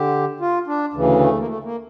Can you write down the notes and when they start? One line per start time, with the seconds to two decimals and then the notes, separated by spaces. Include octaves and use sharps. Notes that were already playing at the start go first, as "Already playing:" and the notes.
Already playing: D3 G4
0.40 F4
0.67 D4
0.93 D2 C#3 E3
1.20 A3
1.39 A#3
1.46 A3
1.64 A#3